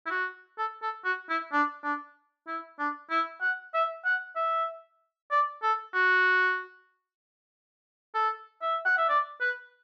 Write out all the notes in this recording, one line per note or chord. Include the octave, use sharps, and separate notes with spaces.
E4
F#4
A4
A4
F#4
E4
D4
D4
E4
D4
E4
F#5
E5
F#5
E5
D5
A4
F#4
A4
E5
F#5
E5
D5
B4